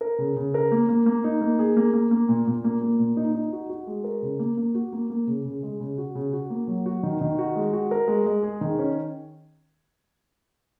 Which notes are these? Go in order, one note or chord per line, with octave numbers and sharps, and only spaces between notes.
A#4
C#3
C#3
A#4
A#3
A#3
A#3
D#4
A#3
G#4
A#3
A#3
A#3
A#2
A#2
A#3
A#3
A#2
D#4
D#4
F#4
F#4
G#3
A#4
C#3
A#3
A#3
F#4
A#3
A#3
C#3
C#3
G#3
C#3
F#4
C#3
F#4
A#3
F#3
F#4
D#3
D#3
F#4
G#3
F#4
A#4
G#3
G#3
G#4
D#3
C#4